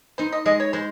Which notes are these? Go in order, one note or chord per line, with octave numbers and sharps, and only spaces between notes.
D#4 C5
D#5
G#3 D#5
C#5
G#3 C5